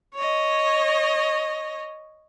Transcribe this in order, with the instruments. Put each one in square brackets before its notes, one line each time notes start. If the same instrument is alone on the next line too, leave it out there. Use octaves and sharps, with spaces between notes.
[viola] C#5 D#5